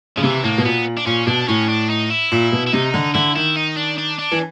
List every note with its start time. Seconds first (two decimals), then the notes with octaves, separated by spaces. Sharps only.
0.17 C#3 F3
0.23 C3 E3
0.43 A2 A#3
0.58 B2
0.65 A#2 B3
0.97 D4
1.06 A#2 C#4
1.27 B2 D4
1.48 A2 C#4
1.69 D4
1.90 D#4
2.11 E4
2.32 A#2
2.52 B2
2.67 E4
2.73 C3 D#4
2.94 D3
3.14 D3 E4
3.36 D#3 E4
3.56 D#4
3.76 D4
3.98 D4
4.19 D4
4.32 E3